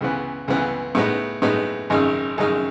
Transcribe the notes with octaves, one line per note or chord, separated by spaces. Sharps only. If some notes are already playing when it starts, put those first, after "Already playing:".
C#2 C#3 E3 B3
C#2 C#3 E3 B3
A2 G#3 B3 D#4
A2 G#3 B3 D#4
G#1 F#2 C#3 G#3 D#4
G#1 F#2 C#3 G#3 D#4